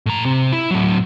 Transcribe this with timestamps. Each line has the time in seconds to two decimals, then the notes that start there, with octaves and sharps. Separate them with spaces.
0.06 A2 A#5
0.25 C3
0.52 E4
0.71 A2 F#3